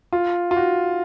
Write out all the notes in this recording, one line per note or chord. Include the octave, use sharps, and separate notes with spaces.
F4
F4
F#4